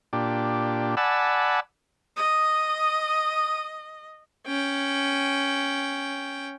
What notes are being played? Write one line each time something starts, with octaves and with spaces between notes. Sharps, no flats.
A#2 D4 G4
D5 F#5 G#5 A5 B5 E6
D#5 D#6
C#4 G5